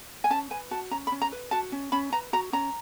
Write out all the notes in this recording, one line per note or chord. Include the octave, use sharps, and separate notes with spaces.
G#5
C#4 A5
B4 G#5
F#4 A5
C#4 A#5
B5
C#4
A#5
B4
F#4 A5
C#4
C#4 B5
B4 A#5
F#4 A#5
C#4 A#5